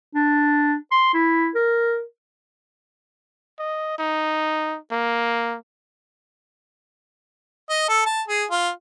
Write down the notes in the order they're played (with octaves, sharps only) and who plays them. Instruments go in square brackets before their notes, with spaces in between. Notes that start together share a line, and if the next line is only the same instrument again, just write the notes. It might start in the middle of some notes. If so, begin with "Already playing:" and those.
[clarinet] D4
C6
E4
A#4
[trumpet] D#5
D#4
A#3
[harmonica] D#5
A4
A5
G#4
F4